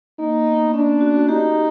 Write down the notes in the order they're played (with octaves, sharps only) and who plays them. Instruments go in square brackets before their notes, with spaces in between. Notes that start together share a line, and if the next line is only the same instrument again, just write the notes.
[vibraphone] A#3 [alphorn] D#4
[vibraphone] B3
[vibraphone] C#4 [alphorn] D4
[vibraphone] F#4
F#4
[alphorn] D#4 [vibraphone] G4
[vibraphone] G4